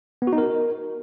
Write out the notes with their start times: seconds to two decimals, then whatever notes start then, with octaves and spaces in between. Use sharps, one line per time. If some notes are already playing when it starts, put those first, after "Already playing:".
0.22 B3
0.27 F#4
0.33 D#4
0.38 A#4